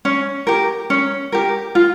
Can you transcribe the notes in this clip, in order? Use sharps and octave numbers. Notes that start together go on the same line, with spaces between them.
C#4
G4 A#4
C#4
G4 A#4
F4